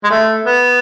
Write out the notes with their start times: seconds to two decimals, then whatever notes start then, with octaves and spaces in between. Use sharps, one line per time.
0.04 G#3
0.11 A3
0.46 B3